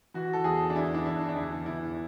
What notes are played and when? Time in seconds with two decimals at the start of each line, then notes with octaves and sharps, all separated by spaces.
0.14 E3 F#4
0.33 A4
0.44 E2 G#4
0.70 D4
0.75 E2 E4
0.94 D4
1.06 E3 E4
1.29 D4
1.36 E2 E4
1.66 E2 E4